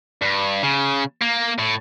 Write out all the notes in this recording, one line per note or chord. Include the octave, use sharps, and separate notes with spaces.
G2
C#3
A#3
A2